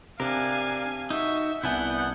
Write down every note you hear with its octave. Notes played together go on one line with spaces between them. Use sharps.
C3 D4 A#4 F5 G#5
D#4 F#4 E5
C2 B3 D4 E4 F#5 G#5 G6